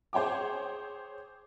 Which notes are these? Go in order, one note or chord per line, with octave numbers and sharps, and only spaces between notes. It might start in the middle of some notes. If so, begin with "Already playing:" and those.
G#4 C5 C#5 G5 D6